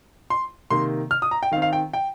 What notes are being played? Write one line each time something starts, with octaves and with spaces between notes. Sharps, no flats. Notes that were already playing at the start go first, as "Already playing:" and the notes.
C6
C3 D#3 A#3 C6
F6
D#6
A#5
G5
D#3 C4 F5
F5
G5
G5